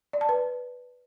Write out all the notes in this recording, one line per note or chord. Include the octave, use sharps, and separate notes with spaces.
D5
A5
B4